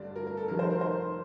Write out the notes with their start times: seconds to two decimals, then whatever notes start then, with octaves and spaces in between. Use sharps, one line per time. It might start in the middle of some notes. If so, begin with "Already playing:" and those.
Already playing: A1 G2 D3 G3 D5
0.16 A#4
0.27 A#4
0.37 A4
0.48 F1 F2 D#3 G3 A#4
0.59 C5
0.70 A#4
0.81 C5